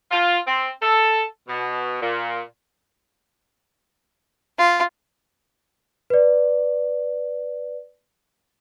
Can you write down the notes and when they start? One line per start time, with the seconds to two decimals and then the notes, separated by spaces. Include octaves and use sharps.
0.11 F4
0.47 C4
0.82 A4
1.48 B2
2.01 A#2
4.59 F4
6.10 B4 D5